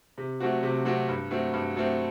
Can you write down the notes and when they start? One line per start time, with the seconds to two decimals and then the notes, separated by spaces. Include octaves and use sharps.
0.18 C3
0.40 F#3 A3 C4 F#4
0.63 C3
0.85 F#3 A3 C4 F#4
1.08 G2
1.31 F#3 A3 C4
1.53 G2
1.76 F#3 A3 C4